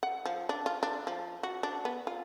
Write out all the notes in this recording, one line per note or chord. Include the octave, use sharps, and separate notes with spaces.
F#5
F3
D4
F4
D4
F3
F#4
D4
B3
F4